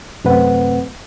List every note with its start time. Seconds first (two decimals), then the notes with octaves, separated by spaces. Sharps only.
0.24 F#2 C3 A3 C4 B4 F#5